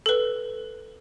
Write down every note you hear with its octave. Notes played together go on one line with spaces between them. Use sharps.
A4 B4